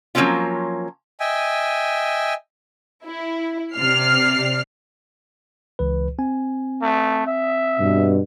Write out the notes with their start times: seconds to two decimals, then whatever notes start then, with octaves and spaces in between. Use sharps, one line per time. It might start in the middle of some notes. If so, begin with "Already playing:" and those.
0.15 F3 F#3 A#3 C4 C#4 F4
1.20 D#5 E5 G5 G#5
3.04 E4
3.74 C3 D5 F6 C7
5.79 C#2 E3 B4
6.19 C4 G#5
6.82 A3
7.27 E5
7.80 G2 B2